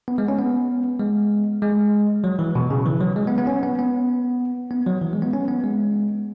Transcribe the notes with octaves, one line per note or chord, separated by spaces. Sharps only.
B3
G#3
C#4
B3
G#3
G#3
F#3
E3
B2
C#3
E3
F#3
G#3
B3
B3
C#4
B3
B3
B3
F#3
E3
G#3
B3
C#4
B3
G#3